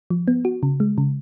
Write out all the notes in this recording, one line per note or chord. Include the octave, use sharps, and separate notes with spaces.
F3
B3
F#4
C#3
G#3
C#3